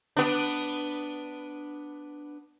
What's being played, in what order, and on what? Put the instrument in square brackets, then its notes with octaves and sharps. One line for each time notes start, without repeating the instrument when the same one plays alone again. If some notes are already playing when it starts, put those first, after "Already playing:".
[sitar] B3 D4